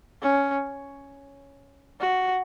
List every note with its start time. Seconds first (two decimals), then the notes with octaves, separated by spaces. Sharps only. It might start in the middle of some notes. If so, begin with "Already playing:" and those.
0.22 C#4
2.00 F#4